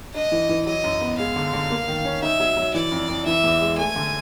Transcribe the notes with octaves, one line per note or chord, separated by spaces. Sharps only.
D4 D#5
E3
E3
F#3 D#5
F#2
B3
G#3 F5
D3
D3
A#3
D#3
C#4
D#4 E5
F#3
F#3
E3 D5
F2
F2
E3 E5
E2
G#3
A3 G#5
D3